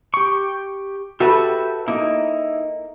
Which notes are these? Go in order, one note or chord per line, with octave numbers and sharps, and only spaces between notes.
G4 C#6
F#4 G4 A4 B4 E5
A#3 D#4 E4